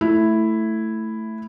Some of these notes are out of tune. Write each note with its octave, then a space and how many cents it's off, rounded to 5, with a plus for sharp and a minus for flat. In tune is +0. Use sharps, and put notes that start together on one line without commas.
A3 +5 E4 +0